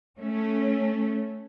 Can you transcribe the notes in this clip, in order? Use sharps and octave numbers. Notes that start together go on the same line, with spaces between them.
A3 C#4